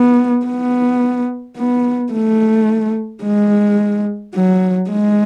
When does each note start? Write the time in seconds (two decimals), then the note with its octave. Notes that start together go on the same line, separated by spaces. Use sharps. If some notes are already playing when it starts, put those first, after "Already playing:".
Already playing: B3
0.46 B3
1.57 B3
2.12 A3
3.24 G#3
4.35 F#3
4.91 G#3